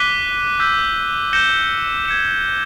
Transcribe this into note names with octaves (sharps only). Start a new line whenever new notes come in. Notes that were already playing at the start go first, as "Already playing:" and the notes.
Already playing: D6 F#6 B6 D#7 G7
E6 G6 B6
G6 A#6 C#7 E7 G7
G#6 C#7 E7